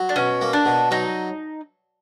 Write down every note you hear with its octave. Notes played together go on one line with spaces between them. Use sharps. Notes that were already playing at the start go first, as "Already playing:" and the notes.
Already playing: F#3
D4
B2 C#4
A#3
D4
B2
F#3 D#4